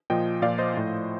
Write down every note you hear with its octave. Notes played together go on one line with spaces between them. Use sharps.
A#2 F3 D#5 G5
A#2 F3 D5 F5
C5 D#5
A2 F3